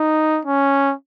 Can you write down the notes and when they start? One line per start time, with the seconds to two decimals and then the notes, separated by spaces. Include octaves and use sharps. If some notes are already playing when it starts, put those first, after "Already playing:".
Already playing: D#4
0.45 C#4